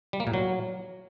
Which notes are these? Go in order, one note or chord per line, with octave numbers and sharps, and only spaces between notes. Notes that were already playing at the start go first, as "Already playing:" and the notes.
G3
A#3
A#2
F#3